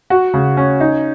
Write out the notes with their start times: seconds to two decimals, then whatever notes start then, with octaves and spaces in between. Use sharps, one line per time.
0.10 F#4
0.34 C#3
0.57 C#4
0.80 D#4